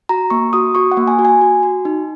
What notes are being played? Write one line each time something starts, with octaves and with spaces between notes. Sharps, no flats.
F#4 A#5
A#3 C#6
F#4 D#6
F#4 C#6
F#5
A#3
G#5
F#4
G#5
F#4
F#4
D#4